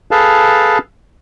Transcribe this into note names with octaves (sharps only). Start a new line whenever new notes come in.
G#4 A4 B4 F5 A5